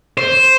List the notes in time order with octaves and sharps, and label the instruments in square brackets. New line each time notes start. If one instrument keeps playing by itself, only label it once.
[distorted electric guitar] C5